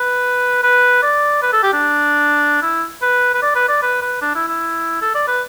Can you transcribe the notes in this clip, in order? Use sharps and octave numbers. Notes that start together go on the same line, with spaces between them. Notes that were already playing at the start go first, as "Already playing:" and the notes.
Already playing: B4
B4
D5
B4
A4
G4
D4
E4
B4
B4
D5
B4
D5
B4
B4
D4
E4
E4
A4
D5
B4